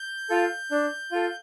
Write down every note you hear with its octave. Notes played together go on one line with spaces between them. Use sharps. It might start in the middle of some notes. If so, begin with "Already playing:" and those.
Already playing: G6
F4 A4
D4
F4 A4